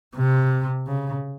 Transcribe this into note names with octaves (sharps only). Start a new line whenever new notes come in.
C3
C#3